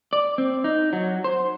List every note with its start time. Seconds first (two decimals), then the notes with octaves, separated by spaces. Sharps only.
0.13 D5
0.38 C4
0.64 D#4
0.93 F#3
1.24 C5